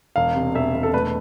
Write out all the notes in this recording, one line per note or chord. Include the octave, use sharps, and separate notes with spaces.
E1 F5
C3
E1 E5
E1
A4
A3 B4